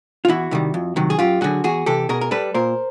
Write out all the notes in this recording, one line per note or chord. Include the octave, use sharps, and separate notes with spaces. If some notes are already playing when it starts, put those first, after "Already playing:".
F4
E2 E4 F#4
C3 D#3 G3
F2
C3 D#3 F#3
G#4
F#2 F4 G4
D3 F#3 F#4 G#4
E2 F#4 G#4
C3 E3 G4 A4
B2 G#4 A#4
A#4
G3 A4 B4
A#2 A#4 C5